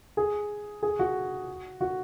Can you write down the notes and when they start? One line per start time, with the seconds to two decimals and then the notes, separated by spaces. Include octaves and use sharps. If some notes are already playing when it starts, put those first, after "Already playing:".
0.17 G#4
0.83 G#4
0.99 F#4
1.81 F#4